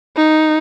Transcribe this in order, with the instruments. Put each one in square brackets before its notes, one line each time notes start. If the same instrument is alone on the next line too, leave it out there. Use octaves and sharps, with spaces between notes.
[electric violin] D#4